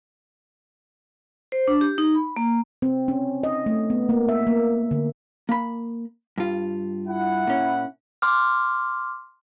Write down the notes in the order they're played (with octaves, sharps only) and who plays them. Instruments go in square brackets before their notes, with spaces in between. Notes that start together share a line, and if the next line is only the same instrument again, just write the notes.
[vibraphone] C5
D4
G4
D#4
B5
A#3
[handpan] C4
C#4
D#5
A3
B3
A#3
E5
A#3
D3
[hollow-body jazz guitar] A#3 B5
G2 F4
[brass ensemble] E4 F#5
[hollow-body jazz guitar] A#2 C#4
[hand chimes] C6 D6 F6